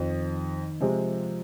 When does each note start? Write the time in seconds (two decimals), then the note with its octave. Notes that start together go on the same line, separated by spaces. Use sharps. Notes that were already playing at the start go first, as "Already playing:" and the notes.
Already playing: F2 D#3 F3 C4
0.81 C3 F3 G#3 C4